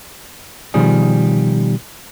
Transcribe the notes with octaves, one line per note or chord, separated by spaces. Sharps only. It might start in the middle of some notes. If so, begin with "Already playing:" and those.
B2 D#3 F3 G3 G#4